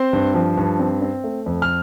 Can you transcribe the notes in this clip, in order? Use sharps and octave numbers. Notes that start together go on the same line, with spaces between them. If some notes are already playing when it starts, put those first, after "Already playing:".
Already playing: C4 C5 C6
G2
F3
G2
C4
C4
A3
F2
F6